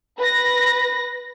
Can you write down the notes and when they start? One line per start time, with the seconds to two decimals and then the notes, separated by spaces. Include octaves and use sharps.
0.19 B4 A#6